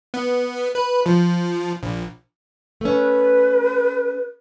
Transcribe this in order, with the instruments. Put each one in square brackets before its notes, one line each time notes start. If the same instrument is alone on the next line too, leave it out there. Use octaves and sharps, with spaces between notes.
[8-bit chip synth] B3
B4
F3
A#1
[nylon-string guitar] A3 C#4 [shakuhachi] B4